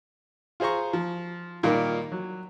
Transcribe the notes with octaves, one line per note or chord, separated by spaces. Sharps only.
F4 G#4 C5 A#5 C#6
F3
A#2 D#3 G3 F4 A#4
F#3